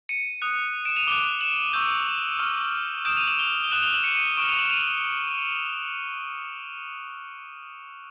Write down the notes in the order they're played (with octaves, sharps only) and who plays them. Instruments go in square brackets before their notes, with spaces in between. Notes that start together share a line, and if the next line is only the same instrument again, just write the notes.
[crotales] C#7 D#7
D#6 F#6
D7 E7
D#7 F7
D6 F#6 F7 G7
E7 F#7
C#6 E6 G6
E7 F#7
C#6 F6
D#6 G6 D7 E7
D#7 F7
E7 F#7
F7 G7
G7
D#6 F#6 E7 F#7
F7 G7
E7 F#7
C#7 D#7
C#7 D#7
C#6 F6 D7 E7
D#7 F7
E7 F#7
D#7 F7